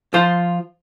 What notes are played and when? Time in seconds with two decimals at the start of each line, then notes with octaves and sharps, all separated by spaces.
0.14 F3 F4 C5